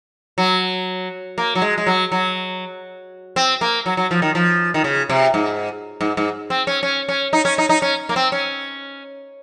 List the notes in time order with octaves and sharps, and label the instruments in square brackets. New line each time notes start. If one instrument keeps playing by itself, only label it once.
[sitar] F#3
A#3
F#3
G#3
G#3
F#3
F#3
C4
A#3
F#3
F#3
F3
D#3
F3
D#3
C#3
C3
G#2
G#2
G#2
C4
C#4
C#4
C#4
D#4
C#4
D#4
D#4
C#4
A#3
C4
C#4